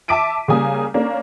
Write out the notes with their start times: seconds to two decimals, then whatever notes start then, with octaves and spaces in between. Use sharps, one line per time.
0.08 E5 A5 D6 B6 D7 D#7
0.48 C#3 G3 A#3 G#5 D#6
0.94 A#3 C#4 D4